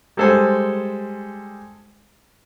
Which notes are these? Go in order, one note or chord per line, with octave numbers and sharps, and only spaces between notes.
G3 G#3 A4 C5 G#5